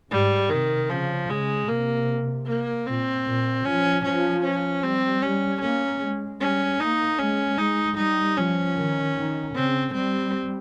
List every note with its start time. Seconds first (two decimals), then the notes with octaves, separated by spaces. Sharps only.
0.11 G#2 G3
0.50 C3 D#3
0.89 C#3 F3
1.29 C#3 G#3
1.68 C3 A#3
2.47 A#3
2.86 A#2 C4
3.26 A#2
3.65 F3 C#4
4.04 F3 C#4
4.44 C#4
4.83 G3 C4
5.22 G3 C#4
5.61 A#3 C#4
6.01 G#3
6.40 G3 C#4
6.80 A#3 D#4
7.19 G#3 C#4
7.58 G#3 D#4
7.97 G3 D#4
8.37 F3 C#4
8.76 D#3
9.16 D#3
9.55 C#3 C4
9.94 G3 C4